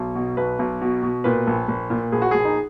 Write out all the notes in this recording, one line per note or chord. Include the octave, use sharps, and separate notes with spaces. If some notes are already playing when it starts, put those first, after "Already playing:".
Already playing: B1
B2
B1 B4
B1
B2
B2
A#2 B4
A#1
A#1
A#2
A#1 G#4
F#4
A#1 G#4
D#4